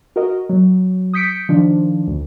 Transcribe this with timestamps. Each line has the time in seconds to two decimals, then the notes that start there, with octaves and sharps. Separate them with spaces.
0.16 F#4 A#4 D#5
0.49 F#3
1.14 D#6 G6 B6 C#7 D7
1.49 D#3 F3 D4
2.08 D2